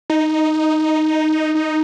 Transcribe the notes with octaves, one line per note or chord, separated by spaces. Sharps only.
D#4
D#4